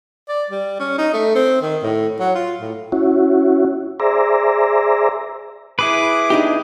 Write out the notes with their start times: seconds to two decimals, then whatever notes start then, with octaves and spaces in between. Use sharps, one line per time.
0.29 D5
0.50 G3
0.80 C#4
0.98 D#4
1.14 A3
1.35 C4
1.62 D#3
1.83 A2
2.20 F#3
2.35 F4
2.61 A2
2.92 C#4 E4 F#4
4.00 G#4 C5 D5 E5 A#5
5.79 E4 G#4 B4 D6
6.30 D4 D#4 G4